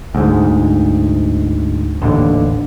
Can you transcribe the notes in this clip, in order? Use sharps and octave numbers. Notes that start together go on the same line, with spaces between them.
D2 G#2
A1 D#2 D3